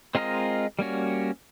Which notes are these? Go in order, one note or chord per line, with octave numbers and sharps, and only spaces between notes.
G#3 C4 F4 A#4 D#5
G3 A#3 C#4 F#4